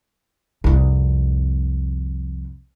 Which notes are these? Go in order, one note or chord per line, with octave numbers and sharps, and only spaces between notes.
C2 F2